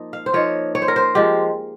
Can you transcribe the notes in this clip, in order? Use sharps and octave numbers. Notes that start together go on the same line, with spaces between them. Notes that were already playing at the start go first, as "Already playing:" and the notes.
Already playing: F3 A#3 D#4
F5
C5
F3 A#3 D#4 C#5
C#5
C5
A#4
C5
F3 G#3 G4